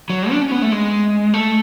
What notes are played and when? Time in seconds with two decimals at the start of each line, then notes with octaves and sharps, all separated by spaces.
0.10 F#3
0.31 D4
0.41 C#4
0.51 B3
0.62 A3
0.72 G#3
1.34 A3